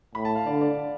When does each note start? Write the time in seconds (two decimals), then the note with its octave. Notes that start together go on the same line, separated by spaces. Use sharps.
0.15 A2 B5
0.25 A5
0.35 F5
0.46 D3 D5
0.61 D5